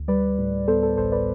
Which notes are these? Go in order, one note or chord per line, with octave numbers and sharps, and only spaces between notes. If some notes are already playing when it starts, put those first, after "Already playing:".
Already playing: D2
G3 B4 D5
A2
B3 A4 C5
A4
A1 A4 C5
B4 D5